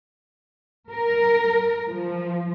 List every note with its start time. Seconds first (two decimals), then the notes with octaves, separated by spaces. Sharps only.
0.90 A#4
1.87 F3